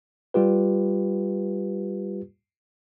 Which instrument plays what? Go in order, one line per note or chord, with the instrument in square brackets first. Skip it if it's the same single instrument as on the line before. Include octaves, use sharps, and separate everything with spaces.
[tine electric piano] G3 F4 G4 B4